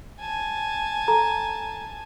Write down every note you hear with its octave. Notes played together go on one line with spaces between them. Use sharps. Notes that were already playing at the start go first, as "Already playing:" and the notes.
G#5 A5
A4 A#5